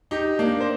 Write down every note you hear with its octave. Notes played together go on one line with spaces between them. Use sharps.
D#4 G4
A#3 D4
C5